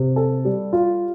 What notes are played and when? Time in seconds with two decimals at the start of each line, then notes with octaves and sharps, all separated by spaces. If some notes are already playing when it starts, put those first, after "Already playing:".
Already playing: C3
0.16 A4
0.45 G3
0.73 F4